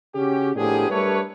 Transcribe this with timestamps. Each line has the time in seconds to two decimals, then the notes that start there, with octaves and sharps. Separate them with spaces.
0.15 C#3 C#4 F#4 G4
0.56 A2 F3 B3 D4 G4 G#4
0.90 G3 A3 D4 A#4 B4 C#5